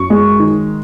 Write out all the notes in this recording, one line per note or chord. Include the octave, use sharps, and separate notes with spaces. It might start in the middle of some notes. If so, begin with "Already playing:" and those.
Already playing: F#2 C#6
G#3
D#3